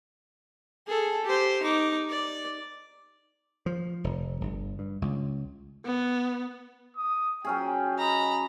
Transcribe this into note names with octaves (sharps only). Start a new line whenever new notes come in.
G#4 A4
G4 C5
D#4 D6
D5
F3
F1
G1
G2
C#2
B3
D#6
F#3 C#4 G#4 G5
D#5 A#5 B5